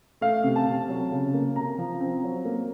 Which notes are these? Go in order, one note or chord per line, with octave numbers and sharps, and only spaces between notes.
A3 F5
C3
A5
C3
F#3
C#3
A#3
C3 A#5
F3
C4
F#3
A#3